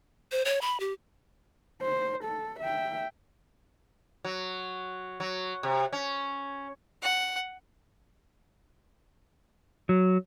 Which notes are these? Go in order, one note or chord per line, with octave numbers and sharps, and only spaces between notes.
C5
C#5
B5
G4
C5
A4
E5 G5
F#3
F#3
C3
C#4
F#5
F#3